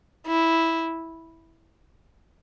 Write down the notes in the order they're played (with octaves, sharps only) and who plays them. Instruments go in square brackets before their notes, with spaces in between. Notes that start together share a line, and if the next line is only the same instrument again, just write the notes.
[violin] E4